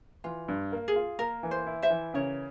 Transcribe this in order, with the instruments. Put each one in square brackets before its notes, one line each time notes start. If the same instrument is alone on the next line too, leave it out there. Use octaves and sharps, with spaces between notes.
[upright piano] E3 [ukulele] F4
[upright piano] G2
A#3
[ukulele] G#4
[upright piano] F4
[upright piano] A#3 [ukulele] A#4
[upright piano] E3
[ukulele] C5
[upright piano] E4
[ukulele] C5 E5
[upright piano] E3
[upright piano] C#3 [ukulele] A#4 C#5